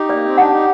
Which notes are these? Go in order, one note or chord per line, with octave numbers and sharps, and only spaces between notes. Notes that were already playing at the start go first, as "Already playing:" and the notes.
Already playing: D#4 G4
A#3 D5
C4
D4 F#5
D#4